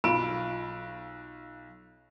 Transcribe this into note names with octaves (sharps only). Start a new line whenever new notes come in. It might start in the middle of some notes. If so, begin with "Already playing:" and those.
B1 F4 B5 D7